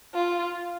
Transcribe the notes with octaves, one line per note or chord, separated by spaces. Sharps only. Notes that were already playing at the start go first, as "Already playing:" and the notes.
F4